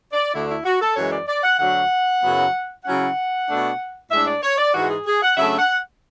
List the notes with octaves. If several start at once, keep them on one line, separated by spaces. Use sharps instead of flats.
D5
D2 D3 A3 D4 E4
E4
F#4
A4
F#2 E3 G#3 C#5
D5
D5
F#5
D2 D3 F#3 F#5
F#2 C#3 F#3 B3 E4
C#3 F#3 C#4 E4 F#5
B2 A3 D4
A2 G#3 D4 E5
D5
C#5
D5
G#2 E3 G#3 F#4
G#4
G#4
F#5
C#3 F#3 A3 D4 E5
F#5